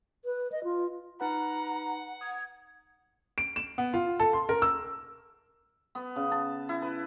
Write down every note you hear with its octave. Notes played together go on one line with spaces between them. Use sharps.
B4
D#5
F4
D#4 B4 F#5 A#5 B5
D#6 G#6
D7
E7
B3
F4
A4
C6
A#4
E6
B3
C#3
A5
E4
B4